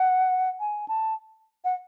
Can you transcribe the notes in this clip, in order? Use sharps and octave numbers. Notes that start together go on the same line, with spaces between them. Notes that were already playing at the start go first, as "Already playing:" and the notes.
Already playing: F#5
G#5
A5
F#5